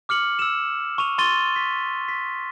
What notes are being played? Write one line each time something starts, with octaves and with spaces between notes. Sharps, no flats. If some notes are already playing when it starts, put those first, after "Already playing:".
D6 F6 C#7 F#7
E6 E7
C#6 D#7 F7
C6 C#6 A6 D#7 G7
B6
B6